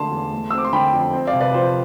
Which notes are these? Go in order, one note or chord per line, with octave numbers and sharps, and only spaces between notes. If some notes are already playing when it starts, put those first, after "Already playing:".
Already playing: D3 A3 D4 A5 C6
E2
A3
C4 E6
D6
C6
D3 G5 B5
F2
C4
D5 F5
C3
B4 D5
F3 C5